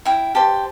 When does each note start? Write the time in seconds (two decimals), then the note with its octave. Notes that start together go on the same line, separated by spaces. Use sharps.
0.05 E4 G5
0.35 G4 C5 A5